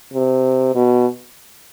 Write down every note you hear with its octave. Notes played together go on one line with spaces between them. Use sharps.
C3
B2